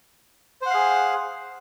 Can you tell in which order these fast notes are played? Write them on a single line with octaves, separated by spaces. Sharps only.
C5 F#5 F5 G#4